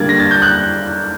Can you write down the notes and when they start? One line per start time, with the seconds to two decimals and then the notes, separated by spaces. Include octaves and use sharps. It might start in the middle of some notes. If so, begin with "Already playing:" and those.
Already playing: D3 G3 A#3 D4 G#6 A6
0.09 A#6
0.20 A6
0.31 G6
0.42 F#6